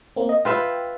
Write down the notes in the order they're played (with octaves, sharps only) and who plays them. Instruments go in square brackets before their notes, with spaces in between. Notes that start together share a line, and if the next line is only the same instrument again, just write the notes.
[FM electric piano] A#3 C4
D#5
[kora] F4 B4 E5 [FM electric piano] G5